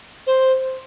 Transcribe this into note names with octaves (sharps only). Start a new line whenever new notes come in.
C5